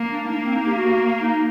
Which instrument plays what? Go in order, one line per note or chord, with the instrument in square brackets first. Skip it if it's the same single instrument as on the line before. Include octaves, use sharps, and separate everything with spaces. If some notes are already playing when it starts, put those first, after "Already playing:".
Already playing: [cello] A#3
[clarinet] D4
D#4
[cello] A#3 [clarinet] D4
[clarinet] C4
D#4
G4
F#4
D#4